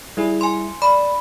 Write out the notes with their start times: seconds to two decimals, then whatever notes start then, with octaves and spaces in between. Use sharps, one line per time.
0.17 G3 E4 G#4
0.41 G#5 C6
0.82 D5 B5